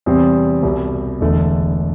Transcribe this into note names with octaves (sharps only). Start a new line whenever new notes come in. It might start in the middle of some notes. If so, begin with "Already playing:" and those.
E2 C3 G3 C4
C2 B2 G3
E1 E2 D3 A3